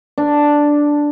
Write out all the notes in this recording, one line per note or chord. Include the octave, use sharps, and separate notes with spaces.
D4